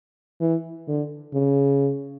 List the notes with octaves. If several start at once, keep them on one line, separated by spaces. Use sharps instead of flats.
E3
D3
C#3